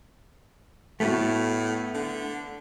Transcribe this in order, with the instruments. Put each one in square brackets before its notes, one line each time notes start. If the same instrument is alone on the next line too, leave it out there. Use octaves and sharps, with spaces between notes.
[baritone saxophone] A2 [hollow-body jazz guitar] A3 B3 F#4
[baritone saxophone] D3